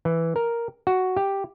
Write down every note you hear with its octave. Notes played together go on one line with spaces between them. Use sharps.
E3
A#4
F#4
G4